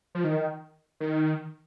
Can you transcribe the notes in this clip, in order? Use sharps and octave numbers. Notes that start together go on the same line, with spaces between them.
F3
D#3
D#3